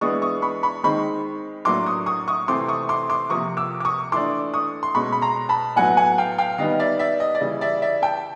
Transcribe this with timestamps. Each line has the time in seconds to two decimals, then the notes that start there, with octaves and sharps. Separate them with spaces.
0.01 E3 G#3 B3 D4 C#6 D#6
0.22 C#6 D#6
0.42 B5 C#6
0.63 B5 C#6
0.84 D#3 G#3 C4 D#4 B5 C#6
1.65 A2 F#3 A#3 D4 C6 D6
1.86 C#6 D#6
2.06 C#6 D#6
2.28 C#6 D#6
2.48 C3 E3 A3 C4 C6 D6
2.68 C#6 D#6
2.89 C6 D6
3.10 C6 D6
3.30 C3 F3 A#3 C#6 D#6
3.57 D6 E6
3.80 D6
3.85 C#6 D#6
4.12 E3 A3 D4 C6 D6
4.54 C#6 D#6
4.83 C6
4.95 B2 G#3 C#4 B5 C#6
5.12 B5
5.22 A#5 C6
5.49 A5 B5
5.76 A2 F#3 B3 F#5 G#5
5.97 F#5 G#5
6.18 F5 G5
6.38 F5 G5
6.58 D#3 G3 B3 D#4 D#5 F5
6.79 D5 E5
6.99 D5 E5
7.20 D#5
7.35 D5
7.41 C#3 E3 G3 D#5
7.61 D5 E5
7.82 D5 E5
8.02 G5 A5